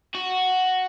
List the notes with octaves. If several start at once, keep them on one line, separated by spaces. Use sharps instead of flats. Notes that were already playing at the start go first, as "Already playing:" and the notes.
F#4